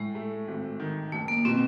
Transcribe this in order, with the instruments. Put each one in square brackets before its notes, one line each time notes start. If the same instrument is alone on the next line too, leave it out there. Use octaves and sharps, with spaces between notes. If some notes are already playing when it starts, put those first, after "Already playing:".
Already playing: [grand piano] A2 [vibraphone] G#3
[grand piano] A3
G#1
D#3
[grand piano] F#1 [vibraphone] A3
[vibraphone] A#3
[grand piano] B2 [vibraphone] C4